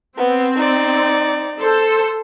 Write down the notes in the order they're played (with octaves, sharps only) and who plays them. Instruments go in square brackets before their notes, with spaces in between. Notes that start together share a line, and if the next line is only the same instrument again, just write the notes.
[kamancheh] B3 [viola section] C4
[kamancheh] D#4 D5
[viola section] A4 C5